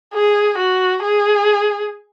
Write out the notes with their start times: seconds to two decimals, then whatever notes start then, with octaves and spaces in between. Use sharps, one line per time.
0.14 G#4
0.58 F#4
1.02 G#4